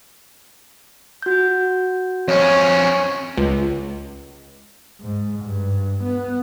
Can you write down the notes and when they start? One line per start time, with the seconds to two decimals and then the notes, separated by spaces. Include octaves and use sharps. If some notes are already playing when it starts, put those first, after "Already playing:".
1.22 F#4 G6
2.28 F2 C#4 C#5
3.38 C#2
5.01 G#2
5.44 G2
6.04 B3